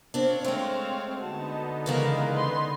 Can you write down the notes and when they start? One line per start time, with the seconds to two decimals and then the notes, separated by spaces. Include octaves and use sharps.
0.14 C4 D4 C#5 F5
0.44 G#3 A3 C4
1.20 D3 B3 D#4 F#4 A5
1.86 C#3 E3 G#3 A#3 A#4
2.32 B4 C6